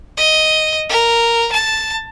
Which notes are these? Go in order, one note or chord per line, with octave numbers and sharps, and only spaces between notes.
D#5
A#4
A5